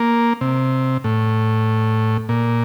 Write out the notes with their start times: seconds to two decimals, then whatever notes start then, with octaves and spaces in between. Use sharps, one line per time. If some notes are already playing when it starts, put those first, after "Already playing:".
Already playing: A#3
0.41 C3
1.04 A2
2.29 A#2